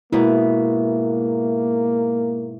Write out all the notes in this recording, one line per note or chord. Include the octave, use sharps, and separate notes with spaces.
G#2 B2 A#3 E4